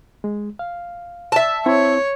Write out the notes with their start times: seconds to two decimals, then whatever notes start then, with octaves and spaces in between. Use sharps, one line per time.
0.24 G#3
0.59 F5
1.32 E5 A5
1.66 C4 E4 C#5